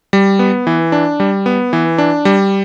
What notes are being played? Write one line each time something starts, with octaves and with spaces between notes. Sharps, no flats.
G3
B3
E3
D4
G3
B3
E3
D4
G3